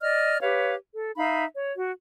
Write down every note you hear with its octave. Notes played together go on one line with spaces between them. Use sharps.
D5 D#5 F6
G4 B4 C#5 F5
A4
D#4 E5 F5 B5
C#5
F#4